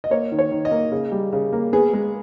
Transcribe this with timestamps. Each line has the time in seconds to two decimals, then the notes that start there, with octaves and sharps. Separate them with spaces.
0.04 D#5
0.11 A#3 C#5
0.32 D#3
0.39 C#5
0.51 D#3
0.65 D#5
0.71 A#3
0.92 C#3
1.12 G3
1.33 C#3
1.53 A#3
1.73 B3 G#4
1.93 G#3